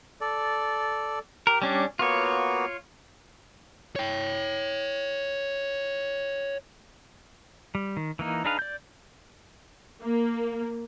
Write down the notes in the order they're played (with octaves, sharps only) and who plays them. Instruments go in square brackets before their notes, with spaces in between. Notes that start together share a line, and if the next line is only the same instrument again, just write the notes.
[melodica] A4 D5
[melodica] G4 [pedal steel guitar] A#4
[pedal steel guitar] G3 C#4 D4
[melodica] A#3 B3 F#4 [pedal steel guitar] F4 C#5
[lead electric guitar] C#5 G5
[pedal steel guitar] G3
D#3
E3 A#3 D#4
D4 D#4 G#4 B4 F5
D5 G6
[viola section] A#3